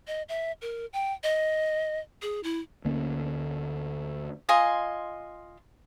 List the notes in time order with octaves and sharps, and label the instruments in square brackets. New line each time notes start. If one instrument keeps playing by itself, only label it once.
[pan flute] D#5
E5
A#4
G5
D#5
G#4
E4
[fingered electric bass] D2 D3 A#3 C#4
[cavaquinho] F4 D#5 G#5 C6